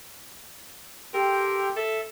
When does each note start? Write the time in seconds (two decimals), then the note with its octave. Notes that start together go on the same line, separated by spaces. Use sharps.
1.14 G4 A4 A#4 G5 C6
1.76 A4 E5